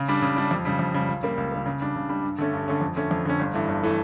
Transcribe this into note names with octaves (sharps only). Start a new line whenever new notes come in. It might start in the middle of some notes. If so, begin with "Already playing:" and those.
Already playing: C#3
G3 D4
C#3
G3 D4
F2
C#3 G3
F2
C#3 G3
C#2
C#3 G3 A#3
C#2
C#3 G3 A#3
C#3
G3 D4
C#3
G3 D4
G2
D3 A3 C#4
G2
D3 A3 C#4
F2
D3 A3 C#4
F2
D3 A3 C#4
G1
G2 E3 A3
G1
E3 A3